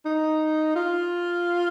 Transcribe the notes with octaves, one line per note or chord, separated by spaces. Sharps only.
D#4
F4